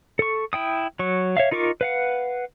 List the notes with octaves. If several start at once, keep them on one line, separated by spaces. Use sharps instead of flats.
A4 C#6
E4 G5 D#6
F#3 C#6
C#5 E5 F5
D#4 F4 A#4 C#6 D6
B4 F5 F#5